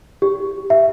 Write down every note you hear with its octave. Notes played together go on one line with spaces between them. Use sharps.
G4
E5